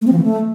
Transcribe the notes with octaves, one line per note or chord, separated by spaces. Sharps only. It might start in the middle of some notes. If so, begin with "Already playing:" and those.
A3
C4
F3
E3
A3